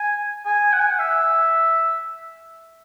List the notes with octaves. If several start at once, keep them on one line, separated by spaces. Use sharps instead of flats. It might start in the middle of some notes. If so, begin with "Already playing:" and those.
Already playing: G#5
G#5
F#5
G#5
F#5
E5